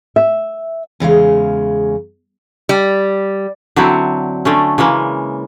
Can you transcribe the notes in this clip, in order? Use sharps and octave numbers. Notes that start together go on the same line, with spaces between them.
E5
E2 C#3 G#3 F5
G3
D3 F#3 C4 E4
D3 A3 C#4
C#3 E3 G#3 A#3